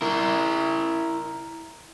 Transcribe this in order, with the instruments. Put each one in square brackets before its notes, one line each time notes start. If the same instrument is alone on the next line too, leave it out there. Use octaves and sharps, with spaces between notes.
[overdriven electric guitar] E4 A#4